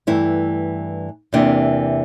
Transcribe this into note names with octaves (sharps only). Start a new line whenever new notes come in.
G2 E3 A3 E4
E2 C3 E3 A#3 D4